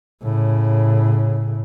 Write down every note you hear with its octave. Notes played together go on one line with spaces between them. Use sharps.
A2 C#3